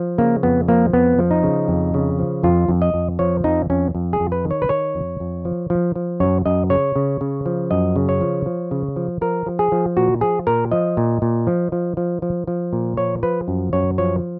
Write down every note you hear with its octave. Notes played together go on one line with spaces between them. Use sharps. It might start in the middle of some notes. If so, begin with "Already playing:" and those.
Already playing: F3
C#3 A#3
F2 B3
F3 A#3
F2 B3
F3
D#4
C#3
F2
C#3
F3
F2 F4
F2
D#5
F2
F3 C#5
F2 D#4
F2 C#4
F2
G#4
F2
B4
D#3
C#5
B4
D#3 C#5
F2
F2
F3
F3
F3
F#2 C#5
F#2 D#5
C#3 C#5
C#3
C#3
F3
F#2 D#5
C#3
C#5
F3
F3
C#3
F3
F3 A#4
F3
G#4
F3
A#2 F#4
F3 G#4
A#2 A#4
F3 D#5
A#2
A#2
F3
F3
F3
F3
F3
A#2
F3 C#5
F3 B4
F#2
F#2 C#5
F3 C#5